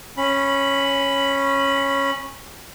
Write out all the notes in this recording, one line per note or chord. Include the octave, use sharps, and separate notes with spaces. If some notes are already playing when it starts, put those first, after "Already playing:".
C#4 B5